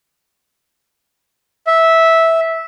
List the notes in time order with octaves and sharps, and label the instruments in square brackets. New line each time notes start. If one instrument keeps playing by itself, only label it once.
[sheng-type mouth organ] E5